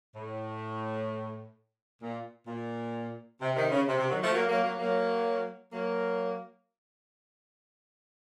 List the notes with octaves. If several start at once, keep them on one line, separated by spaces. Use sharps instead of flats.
A2
A#2
A#2
C3
C3 D#3
C#3
C3
C3
D#3 F#3
F3 A3
F#3 A#3
F#3 A#3
F#3 A#3
F#3 A#3
F#3 A#3